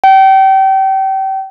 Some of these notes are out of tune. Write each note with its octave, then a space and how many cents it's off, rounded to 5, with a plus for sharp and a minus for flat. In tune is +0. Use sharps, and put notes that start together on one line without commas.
G5 -30